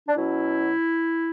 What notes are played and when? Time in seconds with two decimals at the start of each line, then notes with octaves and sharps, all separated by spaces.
0.08 D4
0.16 B2 F#3 C#4 E4